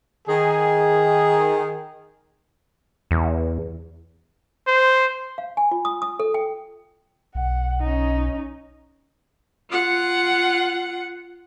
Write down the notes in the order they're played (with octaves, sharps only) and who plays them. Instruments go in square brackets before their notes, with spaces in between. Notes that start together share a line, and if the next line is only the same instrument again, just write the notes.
[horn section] D#3 G#4
[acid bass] E2
[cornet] C5
[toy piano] F5
G#5
F4
D#6
D#6
A4
G5
[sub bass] B1 [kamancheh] F#5
[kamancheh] C#4 D#4
[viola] F4 F#5